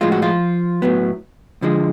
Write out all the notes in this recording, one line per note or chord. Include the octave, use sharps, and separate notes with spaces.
A2 F3 G#3 F4
F#4
F3 F4
A2 F#3 B3
D3 F3 G#3